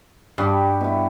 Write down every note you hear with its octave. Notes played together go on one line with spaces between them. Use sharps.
G2 G3 F#4 G4
B2 E4